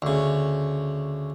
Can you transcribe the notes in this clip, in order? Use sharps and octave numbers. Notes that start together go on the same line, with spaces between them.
D2 C#3